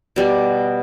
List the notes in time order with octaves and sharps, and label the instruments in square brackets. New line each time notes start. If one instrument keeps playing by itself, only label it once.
[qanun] B2 G3